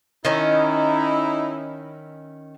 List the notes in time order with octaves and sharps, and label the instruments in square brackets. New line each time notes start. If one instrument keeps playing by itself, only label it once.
[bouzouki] D#3 C#4 [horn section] D#4 E4